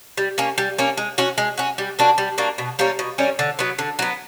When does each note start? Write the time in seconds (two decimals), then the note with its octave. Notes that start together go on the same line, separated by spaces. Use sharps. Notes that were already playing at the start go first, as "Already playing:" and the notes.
0.17 G3
0.38 A#3 C#4
0.58 G3
0.79 A#3 C#4
0.97 G#3
1.18 C#4 F#4
1.38 G#3
1.58 C#4 F#4
1.78 G3
1.99 A#3 D4 F#4
2.18 G3
2.38 A#3 D4 F#4
2.58 B2
2.79 G3 A#3 C#4
2.99 B2
3.18 G3 A#3 C#4
3.39 D3
3.59 F#3 B3
3.79 D3
3.99 F#3 B3